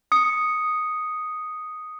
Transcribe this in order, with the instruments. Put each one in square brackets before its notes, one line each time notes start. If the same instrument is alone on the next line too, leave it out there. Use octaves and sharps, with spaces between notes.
[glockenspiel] D#6 C#7